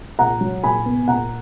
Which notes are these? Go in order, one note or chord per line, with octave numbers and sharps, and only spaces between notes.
A#2 F#5 A#5
F#3
A#2 G#5 B5
B3
A#2 F#5 A#5